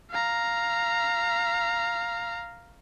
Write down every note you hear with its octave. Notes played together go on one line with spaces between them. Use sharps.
F5 A#5